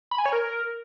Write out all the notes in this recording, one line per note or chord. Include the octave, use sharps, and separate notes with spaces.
B5
G#5
C#5
A#4